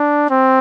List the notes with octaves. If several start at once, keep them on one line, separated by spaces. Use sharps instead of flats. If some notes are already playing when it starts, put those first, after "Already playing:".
Already playing: D4
C4